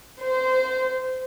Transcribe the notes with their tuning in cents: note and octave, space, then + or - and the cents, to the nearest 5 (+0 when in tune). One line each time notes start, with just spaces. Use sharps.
C5 -20